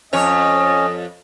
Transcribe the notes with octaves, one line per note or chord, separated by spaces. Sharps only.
F2 C#4 C#5 D#5